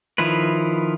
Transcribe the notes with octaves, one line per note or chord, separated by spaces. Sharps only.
D#3 F3 E4 F4 B4